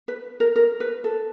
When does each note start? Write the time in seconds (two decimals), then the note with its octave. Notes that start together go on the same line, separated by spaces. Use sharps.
0.08 B4
0.40 A#4
0.56 A#4
0.80 B4
1.04 A4